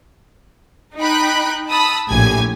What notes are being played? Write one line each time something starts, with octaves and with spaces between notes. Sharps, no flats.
D#4 G5 B5 F#6
A5 B5 D#6 E6
A#1 A2 G4 G#5 G#6